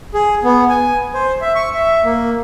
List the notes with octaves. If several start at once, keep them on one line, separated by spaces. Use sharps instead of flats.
G#4
B3
G#5
C5
E5
C#6
E5
A#3